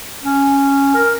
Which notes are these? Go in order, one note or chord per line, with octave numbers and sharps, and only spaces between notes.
C#4
A#4